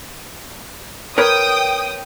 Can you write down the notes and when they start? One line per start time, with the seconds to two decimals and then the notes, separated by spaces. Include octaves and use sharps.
1.18 A#4 B4 C#5 G5 D#6